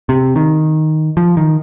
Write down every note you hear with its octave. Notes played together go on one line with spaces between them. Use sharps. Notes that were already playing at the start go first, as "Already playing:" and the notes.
C3
D#3
F3
D#3